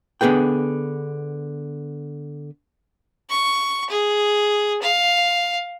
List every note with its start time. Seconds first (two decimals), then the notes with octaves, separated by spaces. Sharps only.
0.21 D3 B3 G#4 B4 G5
3.30 C#6
3.90 G#4
4.82 F5